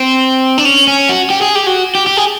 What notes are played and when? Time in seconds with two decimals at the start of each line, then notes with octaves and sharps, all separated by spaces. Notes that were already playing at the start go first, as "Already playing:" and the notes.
Already playing: C4
0.58 D4
0.65 C#4
0.87 C#4
1.09 F#4
1.30 G4
1.42 G#4
1.55 G4
1.67 F#4
1.95 G4
2.07 G4
2.17 G#4